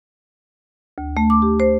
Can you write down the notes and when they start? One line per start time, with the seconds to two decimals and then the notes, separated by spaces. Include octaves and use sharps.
0.98 D2
1.17 A3
1.30 D6
1.42 G4
1.60 C5